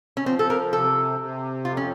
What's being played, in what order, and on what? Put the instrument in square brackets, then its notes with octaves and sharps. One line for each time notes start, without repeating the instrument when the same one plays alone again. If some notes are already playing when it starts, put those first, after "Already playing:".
[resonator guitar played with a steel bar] C#4
[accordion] F3 [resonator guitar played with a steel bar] C4
[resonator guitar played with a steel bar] A4
A#4
[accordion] C3 [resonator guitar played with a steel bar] A4
[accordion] C3
[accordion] F2 [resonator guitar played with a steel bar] F4
[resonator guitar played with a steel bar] C#4